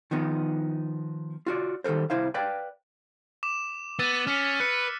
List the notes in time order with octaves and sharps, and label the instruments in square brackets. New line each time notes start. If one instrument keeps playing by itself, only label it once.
[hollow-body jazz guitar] D#3 F3 B3 D#4
F4 F#4 D5
D#3 G3 A4 A#4 C5
C2 E4 C5 F5
B4 D5 F5 G5
[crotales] D6 E7
[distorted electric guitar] B3 [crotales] E6 A6 D#7
[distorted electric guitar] C#4 [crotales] F6 B6 C#7
[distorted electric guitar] B4 [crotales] F#6 C#7